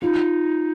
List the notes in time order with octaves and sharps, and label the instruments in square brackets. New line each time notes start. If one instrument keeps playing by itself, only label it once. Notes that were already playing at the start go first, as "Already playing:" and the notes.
[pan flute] D#4 [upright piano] F4